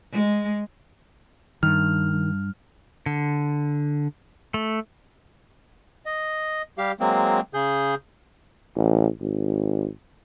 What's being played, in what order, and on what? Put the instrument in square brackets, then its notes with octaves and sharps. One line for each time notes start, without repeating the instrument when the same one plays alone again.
[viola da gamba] G#3
[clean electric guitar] G2 [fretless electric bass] D#3 [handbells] F6
[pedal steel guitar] D3
A3
[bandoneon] D#5
G3 G4 F5
F#3 G#3 A#3 C4
C#3 G#4 G6
[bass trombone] A1
G#1